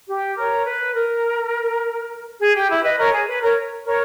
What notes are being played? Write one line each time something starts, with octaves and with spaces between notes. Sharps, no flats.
G4
A#4 C#5
B4
A#4
G#4
G4
E4
B4 D#5
A#4 C#5
G#4
B4
A#4 C#5
A#4 C#5